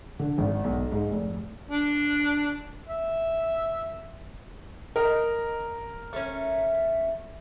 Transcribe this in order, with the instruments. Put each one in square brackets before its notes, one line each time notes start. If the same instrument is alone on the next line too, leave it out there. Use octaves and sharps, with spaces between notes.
[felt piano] D3
G#1
B1
G#2
F1
[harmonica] D4
E5
[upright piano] A#4 [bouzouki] D#5
[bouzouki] A3 C#4